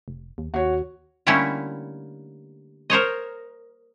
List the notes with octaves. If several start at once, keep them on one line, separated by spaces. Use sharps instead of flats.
F1
D#2
D#2 F#4 C#5
D3 G3 A3 A#3 C#4 E4
A#4 C5 C#5 D#5